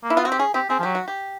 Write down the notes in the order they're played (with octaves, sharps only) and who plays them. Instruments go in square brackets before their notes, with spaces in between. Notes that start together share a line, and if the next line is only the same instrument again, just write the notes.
[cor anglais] A#3
[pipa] E4
[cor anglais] B3 [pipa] F4
[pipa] F#4
[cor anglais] C4 [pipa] G4
[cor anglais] C#4 [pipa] G#4
[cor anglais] C4 [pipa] G4
[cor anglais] C4 [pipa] G#4
[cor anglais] F3
[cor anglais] F#3 [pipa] G4
[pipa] F#4
G4